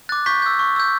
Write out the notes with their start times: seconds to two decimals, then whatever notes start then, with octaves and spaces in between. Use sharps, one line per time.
0.09 D6 F#6 A6
0.26 C#6 G6 B6
0.42 E6 G6
0.59 C#6
0.76 E6 G6